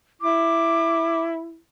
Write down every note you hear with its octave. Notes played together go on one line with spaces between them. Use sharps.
E4 D6